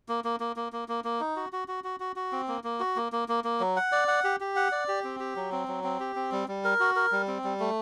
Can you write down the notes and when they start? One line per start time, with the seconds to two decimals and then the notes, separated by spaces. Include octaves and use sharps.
0.09 A#3
0.24 A#3
0.40 A#3
0.56 A#3
0.73 A#3
0.88 A#3
1.04 A#3
1.20 D#4
1.36 F#4
1.52 F#4
1.68 F#4
1.84 F#4
2.00 F#4
2.16 F#4
2.32 C4
2.48 A#3
2.64 A#3
2.80 F#4
2.96 A#3
3.12 A#3
3.28 A#3
3.44 A#3
3.60 F#3
3.76 F#5
3.92 D5
4.08 F#5
4.24 G4
4.40 G4
4.56 F#5
4.72 D5
4.88 G4
5.04 C4
5.20 G4
5.36 F#3
5.52 C4
5.68 F#3
5.84 C4
6.00 G4
6.16 C4
6.32 G3
6.48 G3
6.64 A#4
6.80 F#4
6.96 A#4
7.12 G3
7.28 C4
7.44 G3
7.60 A3